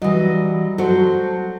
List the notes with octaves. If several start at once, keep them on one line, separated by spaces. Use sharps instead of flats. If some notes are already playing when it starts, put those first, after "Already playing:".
E3 F#3 G3 D#5
F#3 F#4 A4 C5